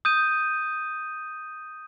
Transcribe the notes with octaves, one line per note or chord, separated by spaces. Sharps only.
D#6 G6 D#7